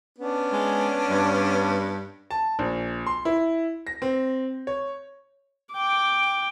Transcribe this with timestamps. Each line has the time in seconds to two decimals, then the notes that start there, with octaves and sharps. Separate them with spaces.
0.18 B3 C#4 D4
0.53 G#3
1.10 G2
2.31 A5
2.59 A#1
3.07 C6
3.25 E4
3.87 A#6
4.02 C4
4.67 C#5
5.73 G5 D6